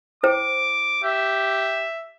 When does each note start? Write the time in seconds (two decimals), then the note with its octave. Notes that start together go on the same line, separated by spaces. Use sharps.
0.23 E4 C5 G5 D6
1.03 G4 E5